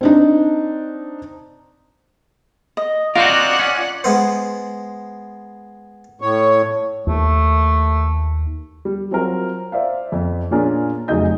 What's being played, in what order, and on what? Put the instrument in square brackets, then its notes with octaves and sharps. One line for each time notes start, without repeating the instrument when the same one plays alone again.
[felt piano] C4 D4 D#4
[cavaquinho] D#5
[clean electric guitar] C4 F#4 A#4 [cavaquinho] F4 D#5 [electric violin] D5 F#5
[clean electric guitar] C#4
[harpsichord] G#3 B3 C5
[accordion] A2 C#5
[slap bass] D#2 [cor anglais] A3
[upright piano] G3
F#3 C4 F4 A#4
C5 D5 E5 F5
F2
A#2 C#4 D4 F4 G#4 A#4
F1 C#3 F#3 D#4 D#5 G6